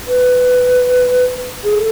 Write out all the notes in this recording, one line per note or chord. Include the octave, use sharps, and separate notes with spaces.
B4
G#4
A4